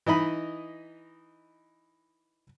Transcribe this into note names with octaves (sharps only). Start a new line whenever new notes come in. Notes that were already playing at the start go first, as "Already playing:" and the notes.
E3 D#4 D#5 B5